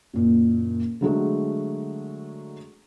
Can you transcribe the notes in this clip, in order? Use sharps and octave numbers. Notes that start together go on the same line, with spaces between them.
F#1 A#2
D3 F#3 G#3 A3